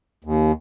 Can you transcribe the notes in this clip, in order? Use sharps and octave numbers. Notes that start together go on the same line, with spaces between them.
D#2